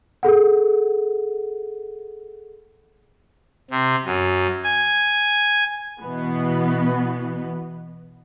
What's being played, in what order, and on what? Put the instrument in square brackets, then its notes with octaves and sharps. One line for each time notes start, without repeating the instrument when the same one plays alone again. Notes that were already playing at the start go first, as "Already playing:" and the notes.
[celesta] G#4 A4 F#5
[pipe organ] C3
F#2
G#5
[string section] B2 E3 B3